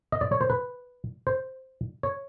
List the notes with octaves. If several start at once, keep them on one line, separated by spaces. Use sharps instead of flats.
D#5
D5
C#5
C5
B4
C5
C#5